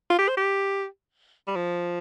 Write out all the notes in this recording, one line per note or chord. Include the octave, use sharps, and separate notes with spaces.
F4
G4
C5
G4
G3
F3